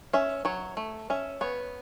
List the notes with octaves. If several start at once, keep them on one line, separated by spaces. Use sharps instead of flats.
C#4 E5
F#3 C#5
A3
C#4 E5
B3 C#5